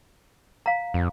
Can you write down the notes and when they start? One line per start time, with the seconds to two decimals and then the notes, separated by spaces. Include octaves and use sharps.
0.66 F5 A#5
0.94 F2